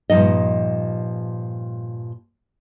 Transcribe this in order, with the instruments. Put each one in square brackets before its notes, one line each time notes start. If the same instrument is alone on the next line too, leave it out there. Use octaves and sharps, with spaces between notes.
[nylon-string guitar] G2 A#2 F3 D#4 D#5